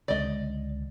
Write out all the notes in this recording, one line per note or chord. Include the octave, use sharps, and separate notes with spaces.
C#2 D3 D5 D#5